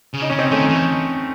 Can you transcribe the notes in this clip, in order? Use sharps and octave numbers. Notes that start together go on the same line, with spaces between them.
C#3
D#4
C#3 C#4
C4 D#4
D#3 A3 C#4
E3